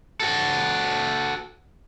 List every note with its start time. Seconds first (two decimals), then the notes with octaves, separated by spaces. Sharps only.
0.20 F#4 A4